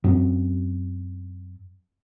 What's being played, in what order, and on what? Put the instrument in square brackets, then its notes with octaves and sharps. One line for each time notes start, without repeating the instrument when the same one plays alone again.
[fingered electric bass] F#2 C4